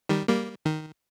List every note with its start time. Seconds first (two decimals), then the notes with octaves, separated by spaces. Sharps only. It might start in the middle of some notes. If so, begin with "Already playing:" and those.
0.09 D#3 G3
0.28 G3 A#3
0.65 D#3